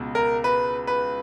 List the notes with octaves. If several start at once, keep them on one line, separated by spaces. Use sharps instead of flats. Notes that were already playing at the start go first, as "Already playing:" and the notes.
Already playing: C#2 B2
A#4
B4
B4